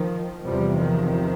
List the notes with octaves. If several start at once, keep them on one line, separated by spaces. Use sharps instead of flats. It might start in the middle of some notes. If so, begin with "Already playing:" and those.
Already playing: D#3 F3
E2 C3 F3 G3
D#3 F3